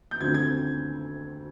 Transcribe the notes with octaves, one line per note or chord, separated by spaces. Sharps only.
G6
D2 D3 F3 C4 G#6
G#6